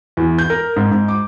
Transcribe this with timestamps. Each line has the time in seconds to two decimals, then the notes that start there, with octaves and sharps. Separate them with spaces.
0.17 E2
0.39 G6
0.50 A#4
0.76 G#2
0.91 G#2
1.08 D6